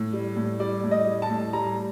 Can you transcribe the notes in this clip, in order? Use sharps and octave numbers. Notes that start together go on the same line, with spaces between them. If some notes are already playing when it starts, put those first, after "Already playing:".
Already playing: A2
G3
A2
G3 D5
A2
D#5
G3
A5
A2
G3 A#5